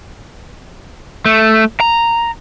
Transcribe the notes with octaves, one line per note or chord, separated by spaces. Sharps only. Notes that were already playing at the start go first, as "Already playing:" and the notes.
A3
A#5